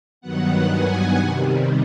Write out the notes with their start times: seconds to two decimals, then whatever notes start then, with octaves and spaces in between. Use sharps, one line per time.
0.21 G2 D#3 F#3 B3 F#5
0.69 G#5
1.18 C3 D#3 G3